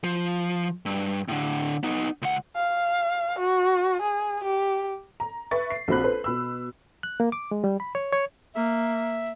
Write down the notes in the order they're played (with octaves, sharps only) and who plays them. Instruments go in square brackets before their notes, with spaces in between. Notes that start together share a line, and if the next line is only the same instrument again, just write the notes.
[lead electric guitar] F3
G2
A2 D3
B3 D#4
C#2 F#5
[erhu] F5
F#4
G#4
G4
[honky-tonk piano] A#5
B4 E5 C#6 A6
C7
A#1 C4 F#4 B5 F#6
A4 B4 C5
B2 B5 E6
[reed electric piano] F#6
A#3
D6
G#3
G3
B5
C#5
C#5
[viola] A#3 [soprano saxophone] E5